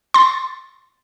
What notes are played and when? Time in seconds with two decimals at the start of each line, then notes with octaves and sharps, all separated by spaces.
0.14 C6 A6